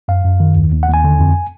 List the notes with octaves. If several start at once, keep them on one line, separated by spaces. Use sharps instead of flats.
F#2 F5
F#2
D#3
D#2
D#2
F#5
D#2
G#5
D3
F2